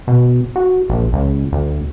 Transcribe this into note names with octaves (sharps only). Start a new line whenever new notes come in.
B2
F#4
A#1
C#2
D2